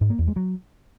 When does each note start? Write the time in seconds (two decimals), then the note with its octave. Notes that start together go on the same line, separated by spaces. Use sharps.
0.01 G#2
0.10 A#3
0.19 E2
0.27 G#3
0.36 F#3